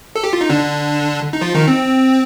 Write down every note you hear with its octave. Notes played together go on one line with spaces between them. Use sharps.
A4
G4
F4
D#4
D3 D4
D#4
F3 F4
D#3 D#4
C4